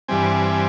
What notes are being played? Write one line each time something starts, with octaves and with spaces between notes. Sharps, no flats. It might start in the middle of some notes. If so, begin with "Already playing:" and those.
G2 E3 G3 C4 G#5
G#5